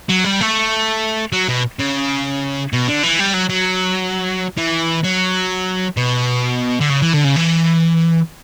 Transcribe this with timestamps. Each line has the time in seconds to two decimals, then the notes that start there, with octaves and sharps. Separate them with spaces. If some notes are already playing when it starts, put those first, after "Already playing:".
0.09 F#3
0.25 G3
0.41 A3
1.33 F#3
1.49 B2
1.79 C#3
2.73 B2
2.88 D3
3.03 E3
3.19 G3
3.34 F#3
3.50 F#3
4.58 E3
5.04 F#3
5.97 B2
6.80 D3
6.90 C#3
7.02 E3
7.13 D3
7.24 C#3
7.36 E3